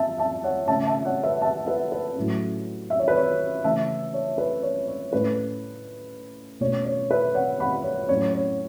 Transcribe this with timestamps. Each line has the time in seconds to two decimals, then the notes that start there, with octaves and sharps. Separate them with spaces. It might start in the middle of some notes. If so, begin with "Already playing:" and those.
Already playing: E5 A5
0.18 E5 A5
0.44 C#5 F#5
0.68 C#3 A3 C#4 E5 A5
0.87 E5 A5
1.05 C#5 F#5
1.23 B4 E5
1.42 E5 A5
1.66 B4 E5
1.92 B4
2.16 A2 F#3 C#4
2.90 E5
2.99 C#5
3.08 B4
3.16 C#5
3.64 C#3 E3 A3 C#4 E5 A5
4.14 C#5
4.38 B4
4.63 C#5
4.88 C#5
5.13 A2 A3 C#4 B4
6.61 B2 A3 C#4 C#5
6.85 C#5
7.11 B4 E5
7.34 C#5 F#5
7.60 F#5 B5
7.84 C#5
8.09 A2 F#3 C#4 C#5
8.34 C#5